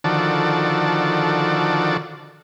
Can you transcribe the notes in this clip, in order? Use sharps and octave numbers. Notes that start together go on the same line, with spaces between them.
D3 D#3 F3 F#4 A4 D5